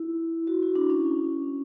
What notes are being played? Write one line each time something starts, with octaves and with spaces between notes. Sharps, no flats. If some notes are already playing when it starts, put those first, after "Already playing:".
Already playing: E4
F#4
E4
D4
C#4